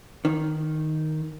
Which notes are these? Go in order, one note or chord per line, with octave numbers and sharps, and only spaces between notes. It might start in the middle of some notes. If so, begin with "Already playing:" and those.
D#3